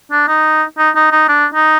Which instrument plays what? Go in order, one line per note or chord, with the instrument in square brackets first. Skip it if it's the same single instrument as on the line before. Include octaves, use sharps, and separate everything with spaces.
[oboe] D4
D#4
D#4
D#4
D#4
D4
D#4